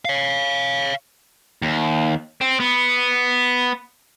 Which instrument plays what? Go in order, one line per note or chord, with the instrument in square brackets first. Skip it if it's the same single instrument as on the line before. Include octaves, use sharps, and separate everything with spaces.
[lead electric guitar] C#5 F5
[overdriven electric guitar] D#2
C4
B3